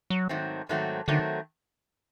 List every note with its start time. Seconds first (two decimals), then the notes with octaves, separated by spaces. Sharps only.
0.10 F#3
0.29 G#2 D#3 F#3 A3 C4
0.69 G#2 D#3 F#3 A3 C4
1.08 D3 D#3 F#3 A3 C4